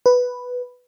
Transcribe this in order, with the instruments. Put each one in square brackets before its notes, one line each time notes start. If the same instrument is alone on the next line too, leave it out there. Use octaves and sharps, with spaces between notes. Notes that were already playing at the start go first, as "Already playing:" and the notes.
[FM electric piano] B4